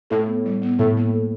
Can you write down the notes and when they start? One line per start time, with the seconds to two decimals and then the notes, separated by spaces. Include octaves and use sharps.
0.10 A2 A4
0.27 B3
0.45 G3
0.62 B3
0.79 A2 A4
0.97 A#3
1.14 A4